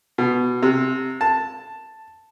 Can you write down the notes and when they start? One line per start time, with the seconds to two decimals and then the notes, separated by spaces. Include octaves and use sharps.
0.18 B2
0.63 C3
1.21 A5